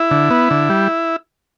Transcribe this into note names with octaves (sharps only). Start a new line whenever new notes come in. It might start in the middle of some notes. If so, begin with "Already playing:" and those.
Already playing: E4
D3
B3
D3
G3